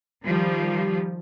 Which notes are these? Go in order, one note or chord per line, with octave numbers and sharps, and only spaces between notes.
D#3 F3 G3